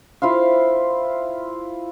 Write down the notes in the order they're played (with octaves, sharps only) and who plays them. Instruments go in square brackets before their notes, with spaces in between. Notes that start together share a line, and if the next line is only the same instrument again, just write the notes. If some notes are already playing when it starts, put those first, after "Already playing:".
[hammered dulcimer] E4 F4 C5 F5